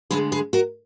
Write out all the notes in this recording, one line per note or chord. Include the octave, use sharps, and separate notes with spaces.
D2 D3 G#3 G#4 B4
G#4 B4
F#4 A#4